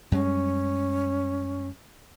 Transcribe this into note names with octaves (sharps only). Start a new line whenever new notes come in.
F#2 G3 G#3 C#4